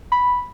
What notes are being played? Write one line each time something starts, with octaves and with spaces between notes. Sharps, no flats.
B5